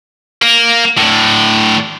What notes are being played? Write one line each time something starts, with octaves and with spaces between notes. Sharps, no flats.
A#3
A2 D3